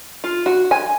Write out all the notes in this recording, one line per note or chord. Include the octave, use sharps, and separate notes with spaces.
F4
F#4
G#5